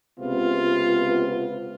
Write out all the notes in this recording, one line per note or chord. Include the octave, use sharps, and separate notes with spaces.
C#2 C3 B3 F4